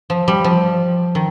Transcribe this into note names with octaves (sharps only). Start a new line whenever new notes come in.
F3
G3
F3
D#3